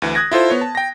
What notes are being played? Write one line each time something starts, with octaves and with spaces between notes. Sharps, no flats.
D2 E3
D#6 F#6 G#6 A#6
E4 F4 A4 C5
B3 C#5
A5
G5 A#6